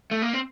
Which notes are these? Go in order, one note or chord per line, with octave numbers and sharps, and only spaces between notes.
A3
A#3
C4